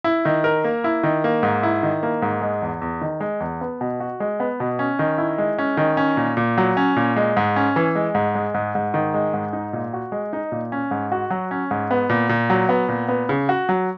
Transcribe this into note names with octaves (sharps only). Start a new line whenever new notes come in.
E4
D#3
A#4
A#3
E4
D#3
A#3
G#2
E4
D#3
A#3
G#2
G#3
E2
E2
D#3
G#3
E2
B3
B2
F#4
G#3
B3
B2
C#4
D#3
E4
G#3
C#4
D#3
C#4
A#2
A#2
F#3
C#4
A#2
G#3
G#2
C#4
E3
G#3
G#2
G#3
G#2
G#2
D#3
G#3
G#2
D#4
A#2
F#4
G#3
D#4
A#2
C#4
G#2
F#4
F#3
C#4
G#2
B3
A#2
A#2
F#3
B3
A#2
B3
C#3
F#4
F#3